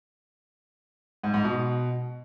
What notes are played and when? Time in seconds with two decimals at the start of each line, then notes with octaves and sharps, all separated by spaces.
1.24 G#2
1.34 G#2
1.44 B2